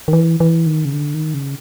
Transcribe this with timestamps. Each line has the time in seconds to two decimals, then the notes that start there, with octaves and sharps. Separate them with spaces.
0.08 D#3
0.13 E3
0.40 E3
0.66 D#3
0.85 C#3
0.93 D3
1.14 D#3
1.34 C#3